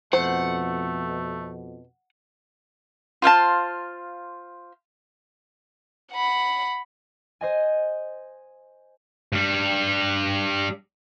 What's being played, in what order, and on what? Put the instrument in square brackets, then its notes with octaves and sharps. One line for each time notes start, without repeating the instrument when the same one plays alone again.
[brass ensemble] F2 B2 [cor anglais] A3 [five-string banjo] C5 [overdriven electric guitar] F#5
[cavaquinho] F4 C5 F5 A5
[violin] F#5 B5
[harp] C5 D#5 G#5
[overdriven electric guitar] G2 G3